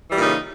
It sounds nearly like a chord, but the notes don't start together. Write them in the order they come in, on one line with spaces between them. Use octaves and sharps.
E3 G3 A#2 D#4 C#3